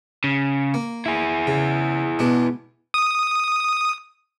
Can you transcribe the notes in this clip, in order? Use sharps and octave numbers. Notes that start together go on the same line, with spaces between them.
C#3
A#3
E4 G#4
C#3
B2 G#3 D4
D#6